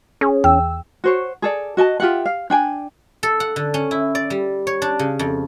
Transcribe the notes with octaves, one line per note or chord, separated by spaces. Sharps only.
C#4 G#4
E2 G5 E6
F#4 C5 C#5
G#4 A4 D5
F#4 D#5 G#5 A5
F4 G4 E5 F#5
F5
D4 G5 G#5
A4
F#5
D3
C#4
E4
D5
G3
C#5
D4
C#3
F2